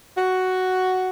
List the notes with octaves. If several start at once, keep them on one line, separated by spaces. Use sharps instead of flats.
F#4